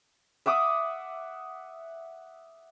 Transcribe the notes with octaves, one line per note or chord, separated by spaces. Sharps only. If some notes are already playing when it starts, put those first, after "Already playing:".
E5 F#5 D6 D#6